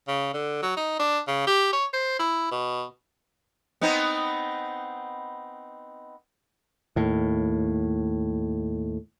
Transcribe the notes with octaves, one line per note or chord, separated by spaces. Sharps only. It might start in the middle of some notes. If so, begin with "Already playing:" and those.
C#3
D3
F#3
D#4
D4
C#3
G4
C#5
C5
E4
B2
B3 C4 D#4
D#2 A2